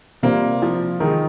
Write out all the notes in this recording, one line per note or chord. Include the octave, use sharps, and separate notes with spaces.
C3 G3 A#3 C4 F4
F3
D#3 G#3 D#4 A#4